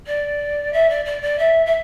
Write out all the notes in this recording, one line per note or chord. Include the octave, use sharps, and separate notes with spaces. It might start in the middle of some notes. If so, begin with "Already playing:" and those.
D5
E5
D5
D5
D5
E5
E5